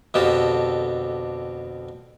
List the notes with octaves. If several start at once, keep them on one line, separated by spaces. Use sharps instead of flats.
F2 B2 D3 G4 A4